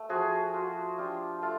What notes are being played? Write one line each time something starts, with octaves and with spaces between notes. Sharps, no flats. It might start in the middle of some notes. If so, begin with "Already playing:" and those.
Already playing: A3
F3 F#4 G#4
F4 F#4
D4 F4 G4
A3 F4